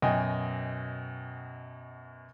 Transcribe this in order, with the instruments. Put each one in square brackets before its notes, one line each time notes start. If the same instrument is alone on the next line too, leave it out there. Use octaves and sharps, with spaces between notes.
[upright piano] F#2 B2 D#5 G5 G#5